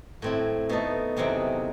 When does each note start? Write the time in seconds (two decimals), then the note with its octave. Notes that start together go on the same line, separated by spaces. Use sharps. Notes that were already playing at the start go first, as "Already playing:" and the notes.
0.22 A2 F#3 C4 E4
0.69 B2 A3 D#4 A4
1.17 E2 C3 F#3 C4 D#4